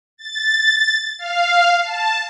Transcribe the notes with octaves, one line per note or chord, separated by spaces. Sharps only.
A6
F5
A5